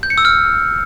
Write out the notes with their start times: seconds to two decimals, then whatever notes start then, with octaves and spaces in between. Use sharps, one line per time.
0.03 G6
0.10 C#7
0.18 E6
0.25 F6